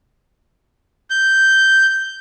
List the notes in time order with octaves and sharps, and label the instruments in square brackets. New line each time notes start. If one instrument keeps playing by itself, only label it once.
[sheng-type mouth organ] G6